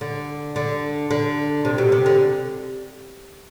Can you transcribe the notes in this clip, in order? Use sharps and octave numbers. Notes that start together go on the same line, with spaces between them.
D3
D3
D3
C3
B2
C3
D3